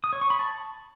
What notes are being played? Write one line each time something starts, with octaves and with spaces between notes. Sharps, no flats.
D#6
C#5
C#6
B5
A5